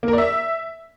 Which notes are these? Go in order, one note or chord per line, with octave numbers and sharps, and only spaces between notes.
A#3
A#4
D5
E5